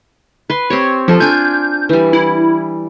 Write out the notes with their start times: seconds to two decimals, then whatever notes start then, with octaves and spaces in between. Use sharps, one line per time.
0.50 B4 C6
0.70 C4 G4 C#5
1.08 F3 F4 A4
1.20 D4 G#5 G6
1.89 E3 G3
2.13 E4